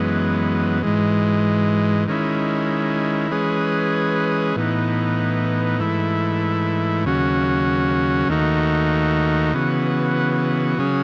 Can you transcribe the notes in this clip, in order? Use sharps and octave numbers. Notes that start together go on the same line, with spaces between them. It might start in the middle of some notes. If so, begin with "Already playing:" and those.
Already playing: F#2 E3 G#3 B3
G#2 E3 G#3
D#3 G#3 C#4 E4
E3 G#3 C#4 G#4 B4
A2 E3 B3 D#4
G#2 E3 A3 E4
D#2 C#3 F#3 C#4 F#4
D#2 D#3 A3 D#4 F#4
C#3 E3 B3 F#4
C#3 F#3 C#4 G#4